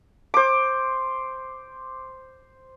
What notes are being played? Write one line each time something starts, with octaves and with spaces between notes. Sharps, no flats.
C5 D6